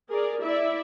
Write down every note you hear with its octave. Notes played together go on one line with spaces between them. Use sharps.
G#4 A#4 D5
E4 D5 E5